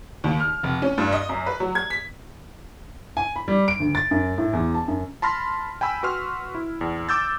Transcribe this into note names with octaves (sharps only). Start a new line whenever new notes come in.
D#2
F6
F1
C#4
G2
D#5
F#2
B4
F#3
G#6
B6
G#5
B5
G3
D7
D2
A6
F#2
A2
E2
A5
F#2
A5 B5 C6 F6 A#6
G5 G#5 B5 E6
F#4 B4 C6 F6
E4
E2
D6 E6 G6 A6